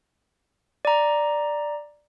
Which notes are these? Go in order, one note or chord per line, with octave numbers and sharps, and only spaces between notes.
D5 A#5